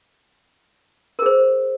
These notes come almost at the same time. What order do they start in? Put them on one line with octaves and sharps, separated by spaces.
A#4 G#4 C5